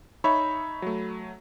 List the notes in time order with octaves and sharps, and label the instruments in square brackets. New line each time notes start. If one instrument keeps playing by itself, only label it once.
[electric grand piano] D#4 C#5 E5 [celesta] B5
[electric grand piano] F#3 A3